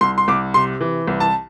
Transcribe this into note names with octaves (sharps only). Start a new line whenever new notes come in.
C2 C6
C6
C2 D6
C3 C6
E3
C2
A5